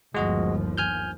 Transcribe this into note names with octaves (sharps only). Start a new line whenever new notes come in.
G1 D#2 F3 G#3 F#4 D#5
G#5 F6 G6